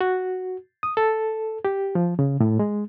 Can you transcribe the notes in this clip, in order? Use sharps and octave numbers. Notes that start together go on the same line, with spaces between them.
F#4
D#6
A4
G4
F3
C#3
A2
G#3